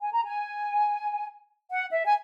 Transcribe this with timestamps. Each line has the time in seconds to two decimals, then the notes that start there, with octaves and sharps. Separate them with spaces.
0.01 G#5
0.13 A#5
0.24 G#5
1.71 F#5
1.92 E5
2.05 G#5